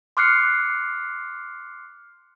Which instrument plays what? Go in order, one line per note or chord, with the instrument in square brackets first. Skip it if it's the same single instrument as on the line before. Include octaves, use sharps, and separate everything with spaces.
[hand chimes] C6 D6 F6 F#6 C7 C#7